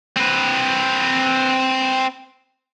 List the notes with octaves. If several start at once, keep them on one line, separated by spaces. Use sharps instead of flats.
C4 B4